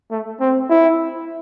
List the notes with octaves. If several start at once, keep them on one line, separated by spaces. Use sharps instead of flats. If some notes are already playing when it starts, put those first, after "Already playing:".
A3
C4
E4